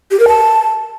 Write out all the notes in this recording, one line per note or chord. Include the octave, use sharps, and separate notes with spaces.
G4
A#4
A5